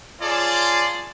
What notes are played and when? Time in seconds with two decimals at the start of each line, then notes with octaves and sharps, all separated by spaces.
0.21 F4 G#4 C#5 D5 A5 C6